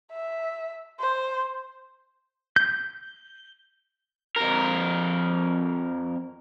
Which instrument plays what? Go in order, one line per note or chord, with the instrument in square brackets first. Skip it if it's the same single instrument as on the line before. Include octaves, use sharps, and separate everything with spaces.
[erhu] E5
C5
[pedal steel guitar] G6
[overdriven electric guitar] F2 A#4